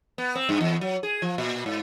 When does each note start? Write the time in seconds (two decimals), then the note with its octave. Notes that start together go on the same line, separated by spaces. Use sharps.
0.18 B3
0.35 C4
0.49 G2
0.61 E2
0.81 F#3
1.03 G#4
1.22 F3
1.38 A#2
1.66 G#2